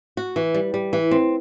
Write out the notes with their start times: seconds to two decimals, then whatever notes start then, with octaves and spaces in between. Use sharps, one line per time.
0.17 F#4
0.36 E3
0.54 G3
0.74 G3
0.93 E3
1.11 C4